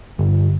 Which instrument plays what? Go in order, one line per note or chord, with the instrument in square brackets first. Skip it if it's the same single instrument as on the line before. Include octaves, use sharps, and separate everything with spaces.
[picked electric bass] G1